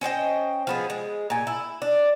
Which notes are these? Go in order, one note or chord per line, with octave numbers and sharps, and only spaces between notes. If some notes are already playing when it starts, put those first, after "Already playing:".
C#4 C5 D#5 G5
F3 B3 G#4
G#3
A#2 G#5
E4
D4